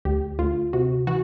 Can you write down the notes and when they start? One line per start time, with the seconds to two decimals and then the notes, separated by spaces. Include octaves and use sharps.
0.05 D2 G4
0.39 D2 F4
0.73 C3 F#4
1.07 E3 F#4